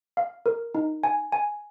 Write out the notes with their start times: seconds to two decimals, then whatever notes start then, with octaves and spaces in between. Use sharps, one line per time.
0.17 F5
0.46 A#4
0.75 D#4
1.04 G#5
1.32 G#5